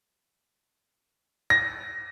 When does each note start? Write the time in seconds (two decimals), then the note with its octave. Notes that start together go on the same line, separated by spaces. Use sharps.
1.50 A#6